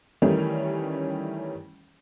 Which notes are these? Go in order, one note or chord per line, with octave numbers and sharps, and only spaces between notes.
D#3 E3 G3 A3 C#4